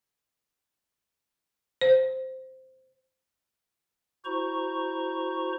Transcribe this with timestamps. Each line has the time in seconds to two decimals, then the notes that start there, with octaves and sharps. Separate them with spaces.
1.81 C5
4.25 E4 F#4 C5 A#5 C#6